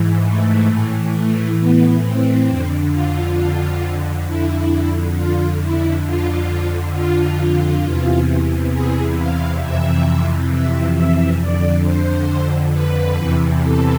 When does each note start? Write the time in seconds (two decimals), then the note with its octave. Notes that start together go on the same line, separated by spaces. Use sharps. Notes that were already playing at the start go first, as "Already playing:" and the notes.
Already playing: G#2 E3
0.24 A3
0.69 A2 E3
1.14 A3
1.59 B3
2.03 C4
2.48 F2 D3
2.93 F4
4.26 F2 D3 E4
5.15 F4
5.60 E4
6.04 F2 D3 F4
6.93 F4
7.83 E2 C3 E3
8.71 G#4
9.17 F5
9.61 F2 C3 E3 E5
10.51 E5
10.95 E5
11.40 F2 D3 D5
11.84 C5
12.73 B4
13.18 E2 C3 E3
13.62 A4